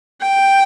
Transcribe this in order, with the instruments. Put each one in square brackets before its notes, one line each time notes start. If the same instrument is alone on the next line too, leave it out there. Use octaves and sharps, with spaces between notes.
[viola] G5